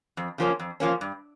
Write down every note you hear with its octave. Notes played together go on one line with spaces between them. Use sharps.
F2
C#3 F3 A#3 C#4
F2
C#3 F3 A#3 C#4
G2